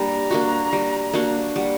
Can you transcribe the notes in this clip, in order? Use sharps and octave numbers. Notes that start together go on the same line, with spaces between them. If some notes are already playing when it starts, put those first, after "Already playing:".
Already playing: G3 A#3 D4 A#5
A#3 D4 F#4
G3
A#3 D4 F#4
G3 F#5